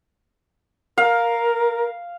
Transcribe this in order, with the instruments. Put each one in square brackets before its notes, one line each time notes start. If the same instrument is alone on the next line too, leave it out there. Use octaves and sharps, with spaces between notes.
[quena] A#4 [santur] F5